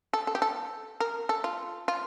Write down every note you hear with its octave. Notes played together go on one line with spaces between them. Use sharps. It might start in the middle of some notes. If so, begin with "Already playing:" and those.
A4
A4
G4
A4
A#4
A4
F4
F4